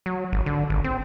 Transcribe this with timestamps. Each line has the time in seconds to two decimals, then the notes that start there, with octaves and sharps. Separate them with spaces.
0.06 F#3
0.33 G#1
0.46 D3
0.70 G#1
0.84 C4